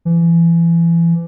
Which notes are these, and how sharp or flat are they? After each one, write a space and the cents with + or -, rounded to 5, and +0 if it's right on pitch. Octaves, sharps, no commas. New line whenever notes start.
E3 +30